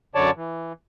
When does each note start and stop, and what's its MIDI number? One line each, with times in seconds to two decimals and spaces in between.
0.15 0.31 42
0.15 0.31 50
0.15 0.31 73
0.15 0.31 74
0.15 0.31 81
0.36 0.73 52